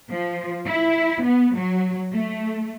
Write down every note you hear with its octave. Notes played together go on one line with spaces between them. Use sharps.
F3
E4
B3
F#3
A3